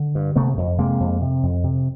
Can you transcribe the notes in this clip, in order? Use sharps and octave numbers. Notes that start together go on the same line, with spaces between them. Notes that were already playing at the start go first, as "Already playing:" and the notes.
Already playing: D3
G2
C3 A3 B3
F2
C3 G#3 A#3
F2
C3
F2
C3